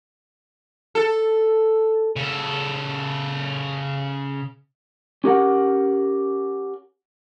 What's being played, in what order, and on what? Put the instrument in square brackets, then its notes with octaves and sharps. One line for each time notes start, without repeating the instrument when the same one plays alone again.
[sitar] A4
[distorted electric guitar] C#3 A4
[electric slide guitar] C#4 G4 A#4 F#5